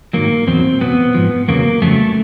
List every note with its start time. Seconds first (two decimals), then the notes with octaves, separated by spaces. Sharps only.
0.13 G#2 D#3 F#3 A#3
0.47 E2 B2 F#3 C4
0.81 E2 B2 F#3 B3
1.14 G#2 F3
1.48 E2 C#3 F#3 A#3
1.82 F2 C#3 F#3 A3